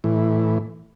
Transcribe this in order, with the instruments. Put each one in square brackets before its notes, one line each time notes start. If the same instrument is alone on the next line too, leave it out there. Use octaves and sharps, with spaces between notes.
[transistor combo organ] A2 E3